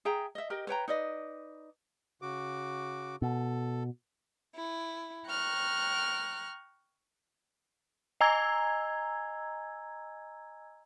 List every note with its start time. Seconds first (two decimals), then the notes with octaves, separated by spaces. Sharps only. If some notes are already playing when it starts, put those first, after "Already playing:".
0.05 G#4 E5 G5 A#5
0.35 D#5 E5
0.50 G4 A#4 D#5
0.67 B4 C#5 G5 A#5
0.88 D#4 B4 D5 D#5
2.22 C#3 F#4 D6
3.22 B2 A4
4.55 E4
5.27 G5 A#5 C#6 F6 F#6
8.21 D#5 G#5 A#5 E6 G#6